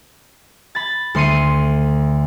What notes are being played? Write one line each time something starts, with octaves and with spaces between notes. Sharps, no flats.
B5 A6
D2 A3 C6 C7 C#7 D#7